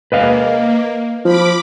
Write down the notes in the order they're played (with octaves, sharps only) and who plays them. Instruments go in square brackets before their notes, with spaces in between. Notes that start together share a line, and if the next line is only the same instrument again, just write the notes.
[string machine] A#3 [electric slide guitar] B4 D#5 F5
[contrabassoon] F3 [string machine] B5 D6